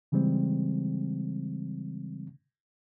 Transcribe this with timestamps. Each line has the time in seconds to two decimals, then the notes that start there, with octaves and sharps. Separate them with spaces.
0.12 C#3 E3 G3 G#3 C4